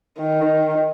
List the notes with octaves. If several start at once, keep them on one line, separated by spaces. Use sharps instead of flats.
D#3